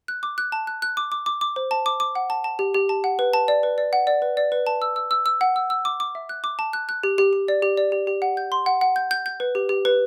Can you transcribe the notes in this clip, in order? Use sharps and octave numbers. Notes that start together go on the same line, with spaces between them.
F#6
D6
F#6
A5
F#6
F#6
D6
D6
D6
D6
C5
A5
D6
D6
F#5
A5
A5
G4
G4
A5
F#5
B4
A5
D5
B4
D5
F#5
D5
B4
D5
B4
A5
E6
E6
E6
E6
F#5
E6
E6
D6
D6
E5
F#6
D6
A5
F#6
F#6
G4
G4
G4
D5
G4
D5
G4
G4
F#5
G6
C6
F#5
F#5
G6
G6
G6
B4
G4
G4
B4